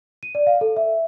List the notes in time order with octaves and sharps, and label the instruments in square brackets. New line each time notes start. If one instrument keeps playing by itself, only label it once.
[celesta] D#7
D5
F5
A4
E5